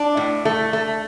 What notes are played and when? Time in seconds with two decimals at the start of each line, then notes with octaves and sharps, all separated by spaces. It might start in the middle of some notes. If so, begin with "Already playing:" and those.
Already playing: D4
0.17 A2
0.45 A3
0.73 A3